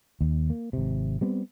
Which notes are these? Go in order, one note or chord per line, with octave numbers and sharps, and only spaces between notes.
D#2
A#3
G#1 C3
G3 B3 C4